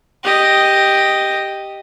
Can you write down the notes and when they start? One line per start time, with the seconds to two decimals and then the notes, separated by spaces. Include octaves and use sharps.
0.24 G4 D#5